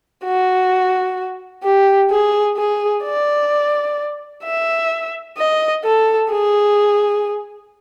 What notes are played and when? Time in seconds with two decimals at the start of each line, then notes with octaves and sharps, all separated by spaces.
0.24 F#4
1.64 G4
2.10 G#4
2.57 G#4
3.04 D5
4.43 E5
5.38 D#5
5.84 A4
6.30 G#4